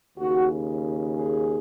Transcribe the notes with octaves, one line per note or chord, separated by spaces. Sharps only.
D#2 C#3 F#4
G#4